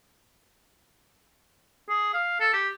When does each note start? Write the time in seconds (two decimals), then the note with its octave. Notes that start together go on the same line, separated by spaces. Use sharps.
1.89 G#4
2.14 F5
2.40 A4
2.53 G4